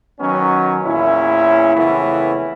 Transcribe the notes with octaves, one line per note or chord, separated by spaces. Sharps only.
D#3 F#3 B3 C#4
E2 A#2 C#4 E4
F2 C#3 E3 A3 B3 C#4